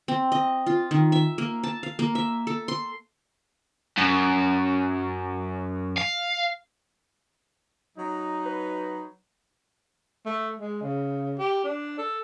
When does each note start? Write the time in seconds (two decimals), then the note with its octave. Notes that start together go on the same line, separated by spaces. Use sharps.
0.08 C4
0.32 D#5
0.66 F4
0.91 D#3
1.12 E5
1.38 A#3
1.63 A5
1.83 F5
1.99 A#3
2.15 E5
2.47 A4
2.68 C6
3.98 F#2
5.98 F5
7.98 F#3 D#4
8.45 B4
10.26 A3
10.60 G#3
10.82 C#3
11.38 G4
11.64 D4
11.99 A4